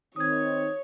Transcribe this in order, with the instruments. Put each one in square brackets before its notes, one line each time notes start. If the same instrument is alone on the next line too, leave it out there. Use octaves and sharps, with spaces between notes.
[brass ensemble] D#3 C4 D#4 [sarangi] C#5 [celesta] D#6 G#6